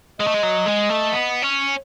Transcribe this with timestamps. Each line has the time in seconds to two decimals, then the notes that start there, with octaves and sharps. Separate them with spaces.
0.20 G#3 D#5
0.27 A3
0.34 G#3
0.43 F#3
0.66 G#3
0.89 A3
1.12 B3
1.42 C#4